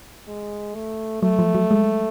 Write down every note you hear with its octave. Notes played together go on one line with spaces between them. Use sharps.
G#3
A3
F#3 A3
F3
F#3
G#3